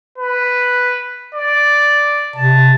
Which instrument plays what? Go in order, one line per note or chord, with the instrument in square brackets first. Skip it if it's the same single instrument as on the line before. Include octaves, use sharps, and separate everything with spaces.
[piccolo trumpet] B4
D5
[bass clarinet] C3 [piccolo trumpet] A5